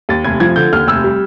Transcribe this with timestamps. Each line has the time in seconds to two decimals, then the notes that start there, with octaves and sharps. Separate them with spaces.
0.09 D#2 A6
0.24 F1 G#6
0.40 F3 G#6
0.56 D3 G6
0.73 D#2 F6
0.87 F1 E6
1.04 G3